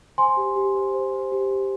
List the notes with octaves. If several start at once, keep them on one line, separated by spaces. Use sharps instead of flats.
C5 G#5 C6
G4
G4
C5
C5
C5
G4
G4